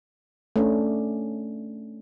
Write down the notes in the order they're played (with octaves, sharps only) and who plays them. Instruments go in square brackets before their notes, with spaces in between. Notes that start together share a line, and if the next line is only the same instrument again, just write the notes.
[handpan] A3 C#4 D4